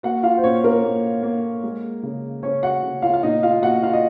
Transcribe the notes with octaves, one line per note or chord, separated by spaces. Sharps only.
A#3 F#4 F#5
F4 F5
C5
A#2 C#4 C#5
A#3 A#4
A#3
A#3
G#3
C#3
C#3 C#4 C#5
F#4 F#5
C#3
F4 F5
F5
A#2 D#4 D#5
F4 F5
A#2 F#4 F#5
F4 F5
D#5